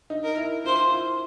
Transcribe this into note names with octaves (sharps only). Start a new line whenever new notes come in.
D#4
A#4
E4
F4 C5
F4
E4